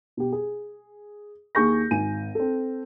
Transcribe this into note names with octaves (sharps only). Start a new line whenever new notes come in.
B2 G4
G#4
D#2 G#4 C#6 G6 A#6
G#1 G#5 D#7
C4 A4